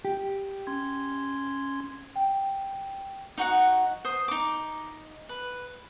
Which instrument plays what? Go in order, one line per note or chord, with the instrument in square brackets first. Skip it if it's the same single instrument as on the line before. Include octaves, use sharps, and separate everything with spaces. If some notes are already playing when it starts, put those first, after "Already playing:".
[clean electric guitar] G4
[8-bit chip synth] C#4 C6 G#6
[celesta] G5
[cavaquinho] D#4 F#4 F#5
C5 D#6
D#4 D6
B4